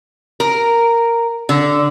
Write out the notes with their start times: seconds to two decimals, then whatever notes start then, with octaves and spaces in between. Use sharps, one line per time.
0.40 A#4
1.49 D3